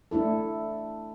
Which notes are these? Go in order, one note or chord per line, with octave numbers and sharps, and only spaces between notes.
A3 D4 E4 A4